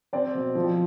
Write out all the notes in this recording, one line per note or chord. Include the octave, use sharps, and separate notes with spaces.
C4 C5 D5
B2
F3